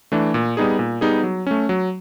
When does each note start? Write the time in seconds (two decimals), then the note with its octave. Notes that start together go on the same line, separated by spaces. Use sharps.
0.12 E3 A3 D4
0.34 A#2
0.57 G3 B3 D#4 G#4
0.79 A#2
1.01 G3 B3 D#4 G#4
1.24 F#3
1.47 A3 C#4
1.69 F#3